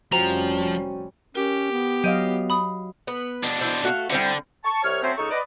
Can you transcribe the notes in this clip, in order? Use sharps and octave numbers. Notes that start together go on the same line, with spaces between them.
F1 F3 G3 C#4 F#4 C5 G5 A#5
C#4 G4 A#4
B3
F#3 D#5 F5 G6 D7 D#7
B5 D#6
B3 B4
B2 D4
E4 C5
A3 F#4 F5
D3 G3 C4 E4
A5 C#6
C2 C#5 F6
F#3 A3 C4 C#4 C5
C#2 D#4 A4 C#6
B4 D5 D#5